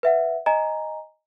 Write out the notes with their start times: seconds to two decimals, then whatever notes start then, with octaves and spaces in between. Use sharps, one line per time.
0.03 B4 E5 F#5
0.46 D#5 G#5 A#5